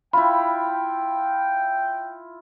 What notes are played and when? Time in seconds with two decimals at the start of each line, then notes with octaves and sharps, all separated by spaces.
0.13 E4 F4 G5 B5